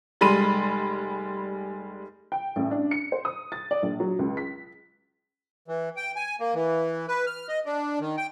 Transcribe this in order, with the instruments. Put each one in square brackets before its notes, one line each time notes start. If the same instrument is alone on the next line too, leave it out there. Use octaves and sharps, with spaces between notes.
[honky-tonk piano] F1 G3 G#3 B5 C6 D#7
G5
A1
D4
C#7
C5
D#6
A6
D5
A#1
F#3
C#2
B6
[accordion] E3
G5
G#5
A#3
E3
B4
F6
D#5
D4
D#3
G5